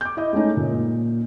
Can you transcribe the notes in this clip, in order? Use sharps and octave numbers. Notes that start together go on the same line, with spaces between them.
D6 G6
E4 D#5
G#3 A3 C#4 D#4
A#2